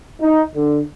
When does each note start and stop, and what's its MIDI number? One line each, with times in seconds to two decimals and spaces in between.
0.21 0.42 63
0.55 0.81 50